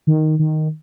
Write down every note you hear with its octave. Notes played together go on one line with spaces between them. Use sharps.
D#3
D#3